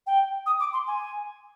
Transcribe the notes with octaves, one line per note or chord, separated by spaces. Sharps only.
G5
D#6
D6
C6
G#5